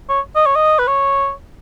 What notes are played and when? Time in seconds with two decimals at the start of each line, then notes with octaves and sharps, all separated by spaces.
0.09 C#5
0.35 D#5
0.46 C#5
0.56 D#5
0.79 B4
0.87 C#5